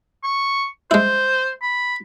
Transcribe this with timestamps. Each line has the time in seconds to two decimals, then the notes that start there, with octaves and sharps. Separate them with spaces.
0.24 C#6
0.91 G#3 E4 C5
1.62 B5